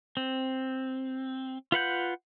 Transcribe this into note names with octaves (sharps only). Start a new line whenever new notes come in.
C4
F4 B4 F#5 G6